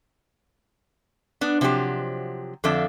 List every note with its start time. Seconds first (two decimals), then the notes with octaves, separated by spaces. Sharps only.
1.41 B3 D4
1.61 C3 F3 F#3 F4 G4 C5
2.64 F2 D3 F3 A4 D5 E5